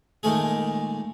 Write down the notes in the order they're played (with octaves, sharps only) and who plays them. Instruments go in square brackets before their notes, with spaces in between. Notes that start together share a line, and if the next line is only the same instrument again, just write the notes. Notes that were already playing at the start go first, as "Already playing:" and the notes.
[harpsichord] A#2 D#3 G#3 A3 G#4